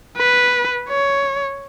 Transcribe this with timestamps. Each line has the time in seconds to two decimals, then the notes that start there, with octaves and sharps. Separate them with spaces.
0.18 B4
0.89 C#5